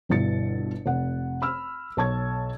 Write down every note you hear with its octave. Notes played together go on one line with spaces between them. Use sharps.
G1 G2 B2 E4 A6 C#7
F1 F#5
B5 E6 F6
B1 C#5 A5 C#6 G#6